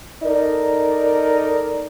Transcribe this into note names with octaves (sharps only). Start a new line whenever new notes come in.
D#4 A4 A#4 D5